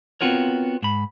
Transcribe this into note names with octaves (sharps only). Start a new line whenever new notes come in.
B3 C4 F4 F#4 A#4 C#5
G#2 B5